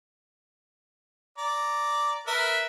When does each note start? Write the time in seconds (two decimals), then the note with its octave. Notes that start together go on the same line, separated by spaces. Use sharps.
1.38 D5 A#5
2.27 A#4 B4 E5